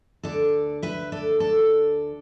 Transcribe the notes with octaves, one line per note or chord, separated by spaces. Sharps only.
D2 D3 A4 D5
B4 E5
A4 D5
A4 D5